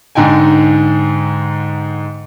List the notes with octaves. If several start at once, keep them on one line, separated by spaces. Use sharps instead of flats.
G#2 D3 D#4 G5 G#5